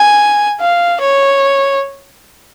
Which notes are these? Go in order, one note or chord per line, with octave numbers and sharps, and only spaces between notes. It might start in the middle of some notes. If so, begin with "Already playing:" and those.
Already playing: G#5
F5
C#5